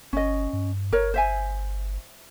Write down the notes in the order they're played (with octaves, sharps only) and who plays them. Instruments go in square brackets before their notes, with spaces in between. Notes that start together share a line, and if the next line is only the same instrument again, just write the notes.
[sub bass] G1 [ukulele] C#4 D#5
[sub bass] G2
[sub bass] G1 [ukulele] A#4 C#5
[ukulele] C5 E5 G#5